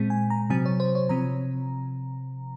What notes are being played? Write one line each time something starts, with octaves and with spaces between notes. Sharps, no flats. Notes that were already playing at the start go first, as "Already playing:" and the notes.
Already playing: A#2 G#3 C4
G#5
A#5
C3 F#3 C4 G#5
C#5
C5
C#5
C3 F3 C4 A#5